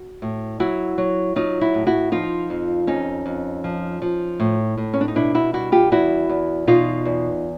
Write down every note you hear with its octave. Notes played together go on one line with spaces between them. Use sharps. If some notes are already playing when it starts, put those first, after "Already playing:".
Already playing: F#4
A2
F#3 E4 F#4
F#3
F#3 D#4 F4
E4 F#4
A2
E4 F#4
F3 D#4 F4
F2
F2 C#4 D#4
F2
F3
F3
A2
A2
C#4
D4
D#4
B2 D4 E4
E4 F#4
G3 E4 F#4
F4 G4
E2 E4 F#4
E2
B2 D#4 F4
E2